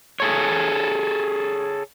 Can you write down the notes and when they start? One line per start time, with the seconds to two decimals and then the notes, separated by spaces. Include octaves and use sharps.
0.20 G#4 A4 C#5